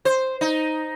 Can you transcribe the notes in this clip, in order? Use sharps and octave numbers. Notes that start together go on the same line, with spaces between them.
C5
D#4